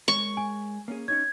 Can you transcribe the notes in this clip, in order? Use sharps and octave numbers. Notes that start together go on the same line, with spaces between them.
G#3 A#4 C#5 C#6
G#5
A#3 C#4 G#4
C#4 D#4 C#5 G#6